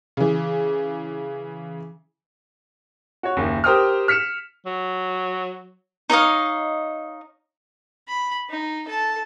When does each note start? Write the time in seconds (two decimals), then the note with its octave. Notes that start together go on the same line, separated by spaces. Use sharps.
0.17 C#3 E3
3.23 F#4 C#5
3.37 F#1 D#2
3.64 G4 A#4 C5 G5 D#6 F6
4.08 F6 B6 C#7 E7
4.66 F#3
6.10 D#4 C#5 D#5 F5
8.08 B5
8.49 D#4
8.88 A4 A5